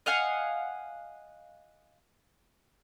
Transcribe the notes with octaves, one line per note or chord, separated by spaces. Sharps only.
D#5 F5 F#5 G#5